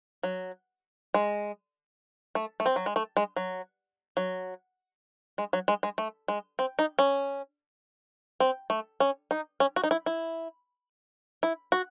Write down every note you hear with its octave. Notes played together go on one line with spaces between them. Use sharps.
F#3
G#3
A3
A3
C4
F#3
G#3
A3
G#3
F#3
F#3
G#3
F#3
G#3
G#3
A3
G#3
C4
D#4
C#4
C4
A3
C#4
D#4
C#4
F#4
D#4
E4
E4
E4
F#4